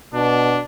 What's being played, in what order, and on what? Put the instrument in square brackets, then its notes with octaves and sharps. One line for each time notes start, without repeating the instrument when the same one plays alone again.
[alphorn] B2 [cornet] D4